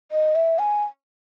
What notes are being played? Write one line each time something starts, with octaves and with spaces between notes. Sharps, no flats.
D#5
E5
G#5